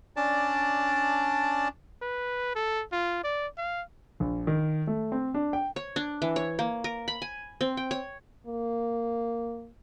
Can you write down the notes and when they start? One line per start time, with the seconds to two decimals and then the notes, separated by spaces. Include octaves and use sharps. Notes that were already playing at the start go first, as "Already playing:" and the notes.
0.16 C#4 D4 D5 A5
2.02 B4
2.55 A4
2.92 F4
3.24 D5
3.57 F5
4.20 A#1
4.47 D#3
4.87 A3
5.12 C4
5.34 D4
5.53 G5
5.76 C#5
5.96 D4
6.22 E3
6.36 C#5
6.59 A#3
6.84 A#4
7.08 B5
7.22 G#5
7.61 C4
7.77 G5
7.91 C#5
8.47 A#3